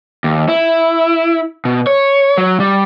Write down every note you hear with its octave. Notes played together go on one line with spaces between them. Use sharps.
D#2
E4
B2
C#5
F#3
G3